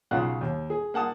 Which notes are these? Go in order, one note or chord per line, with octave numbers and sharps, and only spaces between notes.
B1 C#3 D#4 F4 F#5 F#6
D#2
G#4
A#3 F#5 A5 D#6